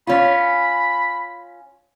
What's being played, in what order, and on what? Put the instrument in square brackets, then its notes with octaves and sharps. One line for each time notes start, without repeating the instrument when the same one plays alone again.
[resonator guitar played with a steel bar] C#4 F4 [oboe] B5